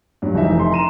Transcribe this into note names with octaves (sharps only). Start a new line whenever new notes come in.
G2 F#3
F1 E3 D#4 E5
C6
A#5 D#7 E7